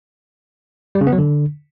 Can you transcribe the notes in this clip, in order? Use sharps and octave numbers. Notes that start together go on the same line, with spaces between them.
G3
C#3
B3
F#3
D3